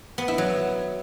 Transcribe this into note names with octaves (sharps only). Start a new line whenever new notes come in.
B3
E4
F#3